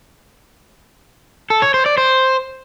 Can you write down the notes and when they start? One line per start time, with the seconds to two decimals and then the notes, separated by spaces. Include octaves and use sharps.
1.50 A4
1.62 C#5
1.74 C5
1.86 D5
1.98 C5